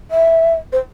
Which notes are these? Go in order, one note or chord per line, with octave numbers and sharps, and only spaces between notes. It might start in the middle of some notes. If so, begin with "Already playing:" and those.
E5
C5